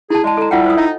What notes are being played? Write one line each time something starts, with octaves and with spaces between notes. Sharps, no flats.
E4 G#4 A5
G#3 D5 A5
A4 A#5
G3 E4 F4 F#5 G5
C5 D#6
D#4 D#5